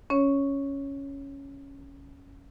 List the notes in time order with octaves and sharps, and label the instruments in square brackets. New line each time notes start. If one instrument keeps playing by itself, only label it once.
[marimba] C#4 C#5